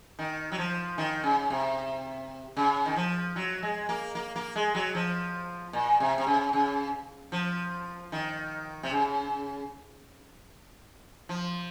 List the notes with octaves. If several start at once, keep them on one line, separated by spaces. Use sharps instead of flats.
D#3
F#3
F3
D#3
C#3
C3
C#3
D#3
F3
F#3
G#3
A#3
A#3
A#3
G#3
F#3
F3
A#2
C3
C3
C#3
C#3
F3
D#3
C3
C#3
F3